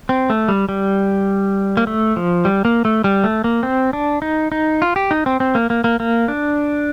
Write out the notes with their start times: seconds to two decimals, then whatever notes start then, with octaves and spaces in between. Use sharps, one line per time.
0.09 C4
0.30 A3
0.48 G3
0.69 G3
1.77 A#3
1.87 A3
2.17 F3
2.45 G3
2.65 A#3
2.85 A3
3.04 G3
3.24 A3
3.44 A#3
3.63 C4
3.93 D4
4.22 D#4
4.52 D#4
4.82 F4
4.96 G4
5.11 D#4
5.26 C4
5.40 C4
5.55 A#3
5.70 A#3
5.84 A#3
6.00 A#3
6.28 D4